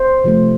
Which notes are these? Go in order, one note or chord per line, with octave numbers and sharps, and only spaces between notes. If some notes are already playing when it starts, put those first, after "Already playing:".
Already playing: C5
C3 F3 A3